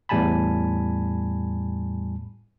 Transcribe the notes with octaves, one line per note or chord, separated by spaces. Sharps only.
E2 A2 G3 G#5 A5 B5